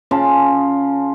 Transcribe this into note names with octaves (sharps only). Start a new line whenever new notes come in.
C#3 F4 A5